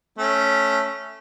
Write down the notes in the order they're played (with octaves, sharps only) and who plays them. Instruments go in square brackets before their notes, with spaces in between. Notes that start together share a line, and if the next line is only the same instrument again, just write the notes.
[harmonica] A3 C#4